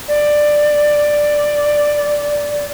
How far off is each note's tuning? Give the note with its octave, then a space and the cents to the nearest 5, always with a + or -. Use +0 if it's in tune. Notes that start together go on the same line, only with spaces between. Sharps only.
D5 +10